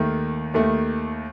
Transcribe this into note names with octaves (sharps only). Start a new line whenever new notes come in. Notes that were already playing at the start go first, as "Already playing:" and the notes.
Already playing: D#2 D#3 A3
D#2 D#3 A3